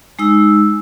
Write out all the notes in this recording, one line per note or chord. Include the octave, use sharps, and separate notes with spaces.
G#3 D#4 E6